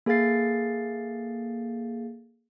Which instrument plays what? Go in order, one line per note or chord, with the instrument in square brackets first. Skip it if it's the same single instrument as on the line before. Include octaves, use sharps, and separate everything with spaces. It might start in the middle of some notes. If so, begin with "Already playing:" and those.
[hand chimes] A#3 G#4 A4 F5 A6 C7